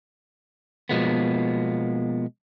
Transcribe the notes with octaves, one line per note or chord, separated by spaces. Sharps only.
B2 F3 G#3 A#3 B3